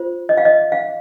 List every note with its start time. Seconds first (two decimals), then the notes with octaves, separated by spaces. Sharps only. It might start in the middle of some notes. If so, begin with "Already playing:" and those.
Already playing: F4 C5
0.29 D#5
0.37 F5
0.45 D#5
0.72 F5